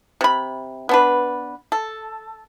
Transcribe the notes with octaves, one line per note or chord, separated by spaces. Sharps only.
C3 B5
B3 D4 B4
A4